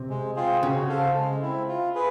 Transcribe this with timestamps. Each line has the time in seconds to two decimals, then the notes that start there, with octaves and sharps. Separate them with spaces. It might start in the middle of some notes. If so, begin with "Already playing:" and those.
Already playing: C3
0.10 G#3
0.36 C4 F4 G#4 C5
0.63 C#3 F#4
0.89 A4 C5 F5
1.15 G#3
1.42 C4 E4
1.68 F4
1.95 G#4 B4